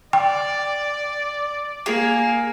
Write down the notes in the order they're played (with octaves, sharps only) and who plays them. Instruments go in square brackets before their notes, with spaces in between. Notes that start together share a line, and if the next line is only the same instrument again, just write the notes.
[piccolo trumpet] D5 [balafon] G5
[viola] A#3 [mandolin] G#4